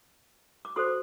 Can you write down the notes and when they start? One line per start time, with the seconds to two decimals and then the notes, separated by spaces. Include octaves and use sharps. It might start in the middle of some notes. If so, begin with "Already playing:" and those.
0.65 D6
0.76 F#4 A4 C5 C6